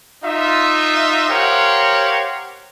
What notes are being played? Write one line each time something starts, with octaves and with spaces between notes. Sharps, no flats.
D#4 F4 E5
G4 A#4 C5 C#5 F5 F#5